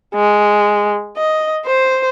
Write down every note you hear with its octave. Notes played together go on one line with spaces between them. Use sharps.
G#3
D#5
C5